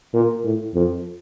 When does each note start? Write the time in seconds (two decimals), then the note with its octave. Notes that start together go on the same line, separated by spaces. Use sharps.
0.13 A#2
0.44 A2
0.74 F2